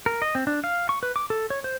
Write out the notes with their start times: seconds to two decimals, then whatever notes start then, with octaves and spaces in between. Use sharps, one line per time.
0.06 A#4
0.22 D#5
0.35 C4
0.47 D4
0.64 F5
0.89 C#6
1.03 B4
1.16 D6
1.30 A4
1.50 C#5
1.64 C5